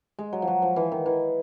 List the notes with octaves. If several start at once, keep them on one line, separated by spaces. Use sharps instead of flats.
G#3
F#3
F3
F#3
F3
E3
D#3
E3